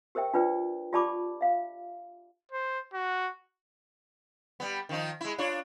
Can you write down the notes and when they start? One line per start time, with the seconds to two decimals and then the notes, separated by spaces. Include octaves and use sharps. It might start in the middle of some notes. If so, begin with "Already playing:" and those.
0.15 G4 A#4 C5 E5 G5
0.34 D4 F4 B4 D5 G5
0.93 F4 G4 D5 A5 B5 D6
1.41 E5 F5
2.52 C5
2.94 F#4
4.60 G3 B3
4.89 D#3 F3 D#4
5.21 G#3 E4
5.38 D4 F4 C#5